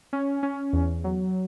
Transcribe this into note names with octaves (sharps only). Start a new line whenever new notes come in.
C#4
C#4
E2
F#3